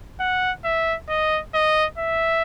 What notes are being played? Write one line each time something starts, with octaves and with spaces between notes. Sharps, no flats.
F#5
E5
D#5
D#5
E5